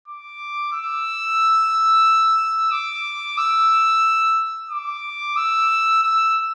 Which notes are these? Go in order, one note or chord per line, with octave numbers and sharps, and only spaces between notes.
D6
E6
D6
E6
D6
E6
E6